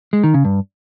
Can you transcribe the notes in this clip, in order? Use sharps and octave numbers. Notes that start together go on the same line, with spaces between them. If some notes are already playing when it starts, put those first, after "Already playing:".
G#3
D#3
C#3
G2